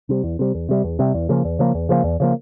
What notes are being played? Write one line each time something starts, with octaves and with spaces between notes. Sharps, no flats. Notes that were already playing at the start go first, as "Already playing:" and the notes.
C3 G3
E2
C3 G3
E2
C3 G3
E2
C3 G3
E2
C#3 F3 A#3
E2
C#3 F3 A#3
E2
C#3 F3 A#3
E2
C#3 F3 A#3